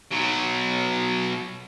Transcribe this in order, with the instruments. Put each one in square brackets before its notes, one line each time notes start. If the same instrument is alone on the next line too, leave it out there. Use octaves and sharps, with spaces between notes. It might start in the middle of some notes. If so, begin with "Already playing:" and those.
[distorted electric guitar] B2 F#3